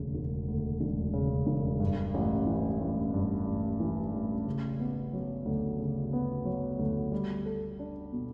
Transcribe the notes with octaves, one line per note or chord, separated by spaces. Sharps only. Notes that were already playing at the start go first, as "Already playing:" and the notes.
Already playing: E1 D2 C#3
E1
D2
E1
C#3
E1
G2
A1
E3
A1
G2
A1
E3
A1
C#3
B3
F#3
D2
C#3
B3
F#3
D2
G3
A4
D4
B2